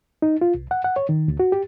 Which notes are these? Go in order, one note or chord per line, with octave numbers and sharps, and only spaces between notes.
D#4
F4
C2
F#5
F#5
C#5
D#3
D2
F#4
G4